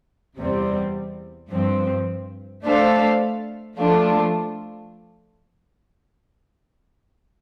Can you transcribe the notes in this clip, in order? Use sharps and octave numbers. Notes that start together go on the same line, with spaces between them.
E2 C3 G3 C4
G2 F3 C4
A3 D4 A4 C5 F5
F3 A3 D4 F4